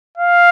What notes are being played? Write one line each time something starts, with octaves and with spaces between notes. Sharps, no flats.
F5